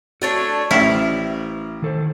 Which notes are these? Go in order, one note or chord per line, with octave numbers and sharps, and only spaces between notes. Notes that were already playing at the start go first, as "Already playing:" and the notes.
A3 D4 F#4 C#5
A1 E4 C5 D5 E5 F5
D#3 A4 C5